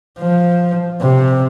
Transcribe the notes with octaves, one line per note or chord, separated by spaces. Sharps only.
F3
C3